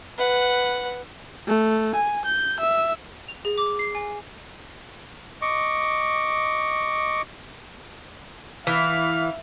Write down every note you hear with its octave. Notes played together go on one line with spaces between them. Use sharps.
B4 F#5
A3
G#5
G6
E5
F7
G#4
D6
C7
G#5
D#5 C#6 D6
E3 F5